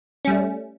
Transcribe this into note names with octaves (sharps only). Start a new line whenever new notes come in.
G3 A3 C#4